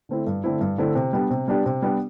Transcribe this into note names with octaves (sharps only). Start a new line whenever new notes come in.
D3 A3 C4 E4
G2
D3 A3 C4 E4
G2
D3 A3 C4 E4
C3
G3 B3 D4 G4
C3
G3 B3 D4 G4
C3
G3 B3 D4 G4